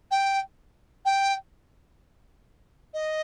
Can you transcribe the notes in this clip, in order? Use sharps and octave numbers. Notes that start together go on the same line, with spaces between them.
G5
G5
D#5